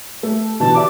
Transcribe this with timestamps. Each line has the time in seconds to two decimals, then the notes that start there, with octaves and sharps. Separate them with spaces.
0.23 A3 A4
0.60 B2 D3 E3 A5
0.75 G4 D5 E5 D6